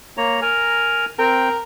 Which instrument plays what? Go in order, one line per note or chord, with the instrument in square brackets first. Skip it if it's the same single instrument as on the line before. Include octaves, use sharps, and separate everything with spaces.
[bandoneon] A#3 C#5 A#5
A#4 G#5 A#5
[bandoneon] C4 G5 [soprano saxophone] A#4